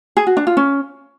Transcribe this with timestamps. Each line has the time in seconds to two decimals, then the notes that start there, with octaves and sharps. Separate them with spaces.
0.17 G#4
0.27 F#4
0.37 D4
0.47 F4
0.57 C#4